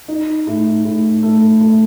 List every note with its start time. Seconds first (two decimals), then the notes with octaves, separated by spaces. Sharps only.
0.08 D#4
0.47 A2
0.85 A2
1.23 A3
1.61 A3